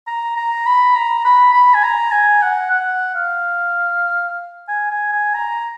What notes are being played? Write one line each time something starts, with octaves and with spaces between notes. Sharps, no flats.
A#5
A#5
B5
A#5
B5
B5
G#5
A#5
G#5
F#5
F#5
F5
G#5
G#5
G#5
A#5